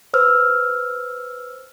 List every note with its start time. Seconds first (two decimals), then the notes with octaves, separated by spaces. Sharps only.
0.14 B4 C5 E6 F6